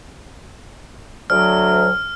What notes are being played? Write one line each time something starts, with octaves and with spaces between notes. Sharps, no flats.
D2 F#3 F6